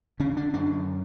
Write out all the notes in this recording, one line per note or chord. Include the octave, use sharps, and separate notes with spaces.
D3 C#4
D4
F#2 D4